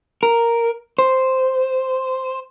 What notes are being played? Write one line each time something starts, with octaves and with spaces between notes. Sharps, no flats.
A#4
C5